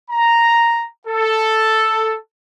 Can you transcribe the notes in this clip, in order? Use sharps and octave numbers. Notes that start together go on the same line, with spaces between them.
A#5
A4